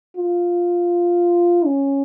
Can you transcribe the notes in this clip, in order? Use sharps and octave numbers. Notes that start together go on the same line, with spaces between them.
F4
C#4